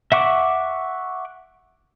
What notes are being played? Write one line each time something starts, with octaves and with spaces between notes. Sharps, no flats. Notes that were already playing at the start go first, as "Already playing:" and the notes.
E5 F#5 C#6 D6